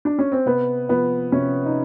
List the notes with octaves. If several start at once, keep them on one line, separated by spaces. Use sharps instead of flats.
D4
C#4
C4
C3 B3
F3 B3
C3 C#4
D#4